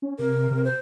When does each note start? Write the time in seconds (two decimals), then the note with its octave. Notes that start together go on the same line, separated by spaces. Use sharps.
0.02 C#4
0.19 C3 A#4
0.51 C3
0.65 C5